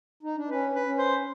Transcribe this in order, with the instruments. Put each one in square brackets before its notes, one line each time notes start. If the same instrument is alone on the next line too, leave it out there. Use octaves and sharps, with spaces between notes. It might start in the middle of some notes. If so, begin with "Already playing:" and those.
[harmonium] D#4
D4
[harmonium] C#4 [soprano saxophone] B4
[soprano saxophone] B4
[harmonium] C#4
[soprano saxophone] C5